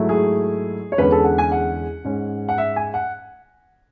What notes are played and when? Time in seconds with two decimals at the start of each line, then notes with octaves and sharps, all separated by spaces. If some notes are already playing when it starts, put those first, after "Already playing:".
Already playing: G#2 F#3 A3 E4
0.09 G#4
0.92 C#5
0.98 E2 D3 G#3 C#4 B4
1.12 A4
1.24 F#5
1.38 G#5
1.52 F#5
2.04 G#2 G#3 C#4
2.49 F#5
2.58 E5
2.76 G#5
2.94 F#5